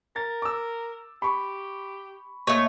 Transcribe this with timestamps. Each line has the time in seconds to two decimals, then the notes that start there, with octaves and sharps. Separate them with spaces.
0.16 A#4 A6
0.42 D6 E6
1.22 G4 B5 C#6
2.47 A#2 A3 C#5 D#5